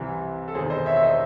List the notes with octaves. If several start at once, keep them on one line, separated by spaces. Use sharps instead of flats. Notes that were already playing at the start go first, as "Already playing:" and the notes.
Already playing: C2 C3 E3
A4
E1 E2 D#3 G#4 C5
C5 D#5
C#5 E5
E5
C5 D#5